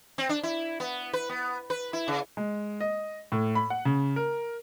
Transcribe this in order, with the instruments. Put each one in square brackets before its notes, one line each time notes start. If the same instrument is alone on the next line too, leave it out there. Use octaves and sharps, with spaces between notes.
[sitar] C4
D4
E4
B3
B4
B3
B4
E4
C#3
[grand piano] G#3
D#5
A2
B5
F#5
C#3
A#4